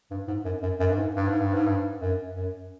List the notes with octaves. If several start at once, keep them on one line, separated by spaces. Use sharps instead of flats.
G2
G#2
F#2
F#2
F#2
G2
G#2
G2
G#2
G2
G#2
G2
F#2
F#2